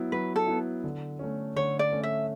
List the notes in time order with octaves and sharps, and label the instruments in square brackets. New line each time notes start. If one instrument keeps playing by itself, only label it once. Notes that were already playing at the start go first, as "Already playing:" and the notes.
Already playing: [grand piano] F#3 B3 E4
[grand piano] F#3 [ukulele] B4
[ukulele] A4
[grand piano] B3 E4
D3
A3 C#4
[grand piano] D3 [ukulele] C#5
[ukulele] D5
[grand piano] A3 C#4
[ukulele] E5